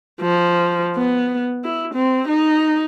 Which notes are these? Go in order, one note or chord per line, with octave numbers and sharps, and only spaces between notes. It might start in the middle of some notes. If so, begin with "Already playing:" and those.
F3
B3
E4
C4
D#4